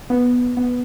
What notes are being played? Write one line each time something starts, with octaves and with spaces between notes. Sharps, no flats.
B3
B3